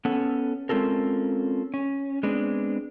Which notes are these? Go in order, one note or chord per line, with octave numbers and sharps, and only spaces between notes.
B3 C#4 A4 F#5
G#3 C4 C#4 F4 A4 A#4
C#4
G#3 B3 C4 D4